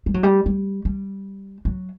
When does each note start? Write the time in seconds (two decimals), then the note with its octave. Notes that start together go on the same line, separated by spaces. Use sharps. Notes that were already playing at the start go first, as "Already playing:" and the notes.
0.06 G3
0.14 F#3
0.23 G3
0.46 G3
0.85 G3
1.65 F#3